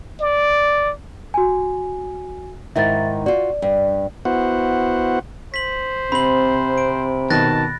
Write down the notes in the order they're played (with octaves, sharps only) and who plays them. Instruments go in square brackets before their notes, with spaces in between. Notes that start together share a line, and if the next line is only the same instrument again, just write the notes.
[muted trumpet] D5
[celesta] F#4 G#5
[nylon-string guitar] G#2 D#3 E4 [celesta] E5 A6
[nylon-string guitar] F4 F#4 [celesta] D5
[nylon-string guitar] G2
[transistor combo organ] B3 E4 F#4 C5 F#5
[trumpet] C5 [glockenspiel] B6 F#7
[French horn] C3 [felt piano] C4 [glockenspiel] B5 F#7
[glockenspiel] D7
[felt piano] B2 D#3 [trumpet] A5 [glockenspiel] F#6 A6 A#6